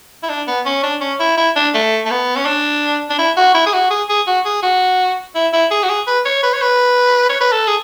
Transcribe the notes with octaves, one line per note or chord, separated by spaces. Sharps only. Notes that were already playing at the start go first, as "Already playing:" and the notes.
E4
D4
B3
C#4
D4
C#4
E4
E4
D4
A3
A3
B3
C#4
D4
D4
E4
F#4
E4
G#4
F#4
G#4
G#4
F#4
G#4
F#4
E4
E4
G#4
F#4
G#4
B4
C#5
B4
C#5
B4
C#5
B4
A4
G#4